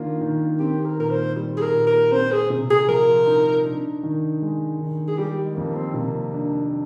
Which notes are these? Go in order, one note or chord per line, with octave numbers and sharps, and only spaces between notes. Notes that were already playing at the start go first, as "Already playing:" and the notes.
Already playing: D#3 A#3 D4 F4
D#3
C4 G4
A#4
A#2 A#4
C5
G3
G#4
A#4
A#2
A#4
C4 C5
G#4
C3
G#4
F3 A#4
D#4
D4
D#3
G#3
D#3
G#4
G3 G4
G#3
F2 A#3
C4
C3 A#3
D4